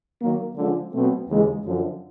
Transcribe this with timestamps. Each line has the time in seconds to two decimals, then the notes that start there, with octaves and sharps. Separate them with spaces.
0.21 D#3 F#3 A#3
0.57 D3 F3 G#3 C#4 F4
0.93 B2 F#3 A3 C4
1.30 D#2 C#3 E3 G#3
1.66 F#2 D3 F3